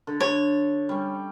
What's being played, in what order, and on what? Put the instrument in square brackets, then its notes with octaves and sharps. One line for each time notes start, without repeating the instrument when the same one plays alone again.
[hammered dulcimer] D3
[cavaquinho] C#5
[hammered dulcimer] G3 C#4